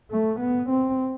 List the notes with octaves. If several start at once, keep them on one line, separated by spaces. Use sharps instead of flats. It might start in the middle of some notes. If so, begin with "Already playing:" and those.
A3
B3
C4